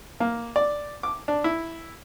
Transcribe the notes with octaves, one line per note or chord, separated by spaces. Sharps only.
A#3
D5
D6
D4
E4